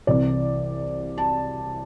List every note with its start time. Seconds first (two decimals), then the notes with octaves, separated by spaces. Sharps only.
0.07 C2 C3 E3 D5
1.18 A5